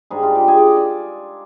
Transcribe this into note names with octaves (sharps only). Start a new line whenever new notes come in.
G#2 G3 D4 G#4
F4
G4
G#4
D5
D#5
D5